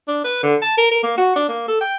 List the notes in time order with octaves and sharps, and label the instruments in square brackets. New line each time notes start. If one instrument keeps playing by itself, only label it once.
[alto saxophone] D4
B4
D3
A5
A#4
A#4
A#3
F#4
D4
A#3
A4
G5